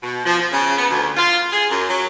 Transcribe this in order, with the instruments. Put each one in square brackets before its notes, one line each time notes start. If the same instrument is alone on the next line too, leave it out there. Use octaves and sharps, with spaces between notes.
[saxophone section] B2
F3
F3
C#3
B3
D2
F4
G#4
F#2
F#3